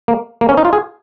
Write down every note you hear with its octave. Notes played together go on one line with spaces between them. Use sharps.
A#3
A#3
C#4
D#4
F4
G#4